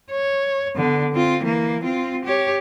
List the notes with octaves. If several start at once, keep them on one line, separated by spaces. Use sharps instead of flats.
C#5
D3 B3
C4 F4
E3 A#3
C4 F4
G4 C#5